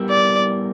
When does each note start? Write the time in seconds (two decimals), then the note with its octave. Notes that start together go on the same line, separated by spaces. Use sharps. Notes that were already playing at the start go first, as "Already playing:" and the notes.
Already playing: G3 B3 E4 G4 A#4
0.10 D5